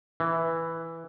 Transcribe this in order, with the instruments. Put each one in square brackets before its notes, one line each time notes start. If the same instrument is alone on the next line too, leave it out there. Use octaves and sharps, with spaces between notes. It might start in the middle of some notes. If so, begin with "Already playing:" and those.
[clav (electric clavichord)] E3